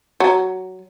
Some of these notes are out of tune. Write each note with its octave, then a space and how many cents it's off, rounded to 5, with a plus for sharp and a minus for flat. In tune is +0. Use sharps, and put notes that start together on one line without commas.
F#3 +10